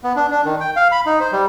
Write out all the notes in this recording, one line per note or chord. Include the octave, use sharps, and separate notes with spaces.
B3
D4
D4
D#3
G5
F5
B5
D#4
C5
G3